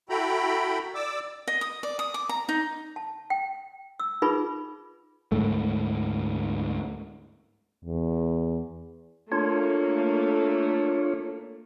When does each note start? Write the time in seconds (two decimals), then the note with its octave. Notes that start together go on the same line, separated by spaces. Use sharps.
0.09 E4 F#4 A4 G5 A#5 B5
0.94 D5 D6 E6
1.48 D#5
1.61 D#6
1.83 D5
1.99 D#6
2.14 D6
2.29 A#5
2.49 D#4
2.96 A5
3.30 G5
4.00 E6
4.22 D#4 F4 G#4 B4 B5
5.32 D2 G#2 A3
7.85 E2
9.32 A3 A#3 D4 F4 C#5